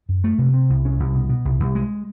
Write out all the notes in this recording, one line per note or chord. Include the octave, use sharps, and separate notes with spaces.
F#2
A3
C3
C4
C2
C#4
C2
B2
B2
C2
C2
G#3